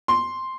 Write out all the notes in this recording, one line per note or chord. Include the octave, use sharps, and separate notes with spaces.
C6